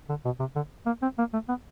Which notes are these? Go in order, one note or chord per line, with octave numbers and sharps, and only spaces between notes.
D3
B2
C3
D3
A#3
C4
A#3
A3
B3